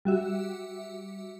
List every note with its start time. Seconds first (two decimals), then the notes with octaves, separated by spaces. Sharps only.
0.05 G3 F#4 E5